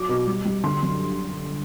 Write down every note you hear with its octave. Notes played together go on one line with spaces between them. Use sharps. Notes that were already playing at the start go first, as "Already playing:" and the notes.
Already playing: F#3 D6
B2
G3
G3
D3 C6
F#2